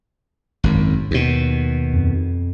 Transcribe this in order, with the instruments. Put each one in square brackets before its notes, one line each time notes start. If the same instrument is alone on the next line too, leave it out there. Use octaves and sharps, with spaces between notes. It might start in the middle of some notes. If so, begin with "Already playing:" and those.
[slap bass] G#1 F#2
D#2 B2
[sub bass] F2